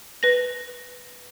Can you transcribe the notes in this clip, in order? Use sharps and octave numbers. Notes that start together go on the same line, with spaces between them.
B4 A#6